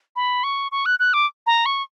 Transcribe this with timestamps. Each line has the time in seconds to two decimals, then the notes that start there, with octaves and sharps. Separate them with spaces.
0.16 B5
0.44 C#6
0.72 C#6
0.86 F#6
0.99 F#6
1.13 D6
1.47 A#5
1.66 C#6